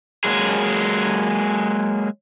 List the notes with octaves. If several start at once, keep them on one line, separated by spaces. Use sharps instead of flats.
F#3 G#3 A#3 G#4